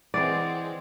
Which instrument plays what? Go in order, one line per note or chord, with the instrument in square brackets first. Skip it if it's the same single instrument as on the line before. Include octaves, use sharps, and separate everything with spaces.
[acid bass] E3 [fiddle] G#3 C4 [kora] D5 [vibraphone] F#5 D6